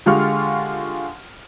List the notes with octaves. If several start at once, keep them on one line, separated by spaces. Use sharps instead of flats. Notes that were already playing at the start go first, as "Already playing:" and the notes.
D3 G#3 F4 G4 C#6 F6